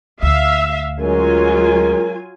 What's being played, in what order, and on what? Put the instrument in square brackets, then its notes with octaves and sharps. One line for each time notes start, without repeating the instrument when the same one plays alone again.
[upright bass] D2 [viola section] E5 F5
[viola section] F#3 F4 G#5 [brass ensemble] G#3 C#4 A#4